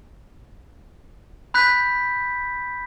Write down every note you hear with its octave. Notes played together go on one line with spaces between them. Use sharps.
B5 F#6 G6 B6